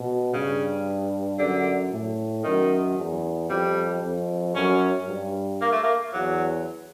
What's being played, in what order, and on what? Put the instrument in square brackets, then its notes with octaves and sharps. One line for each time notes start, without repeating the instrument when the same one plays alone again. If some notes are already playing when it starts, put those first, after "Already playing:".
Already playing: [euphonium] B2
[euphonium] G2 [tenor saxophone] C#3
[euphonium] F#2 [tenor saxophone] D3
[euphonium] A2
[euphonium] F#2 [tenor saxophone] D#3
[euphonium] E2
[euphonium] F2 [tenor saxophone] G3
[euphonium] F2
[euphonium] F#2 [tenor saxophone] C#4
[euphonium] G2
[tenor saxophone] A#3
A3
A#3
[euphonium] E2 [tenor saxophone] F#3